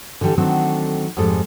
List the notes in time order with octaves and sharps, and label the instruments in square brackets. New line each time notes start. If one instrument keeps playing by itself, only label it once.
[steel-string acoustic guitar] D3 E3 G3 G4 A4
D#3 F#3 A3 C4 D4 A4
F2 G#2 G3 G#3 A4